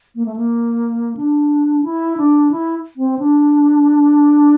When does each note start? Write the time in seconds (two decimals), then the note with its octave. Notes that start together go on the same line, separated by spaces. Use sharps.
0.15 A#3
0.26 A3
0.36 A#3
1.17 D4
1.84 E4
2.17 D4
2.52 E4
2.96 C4
3.19 D4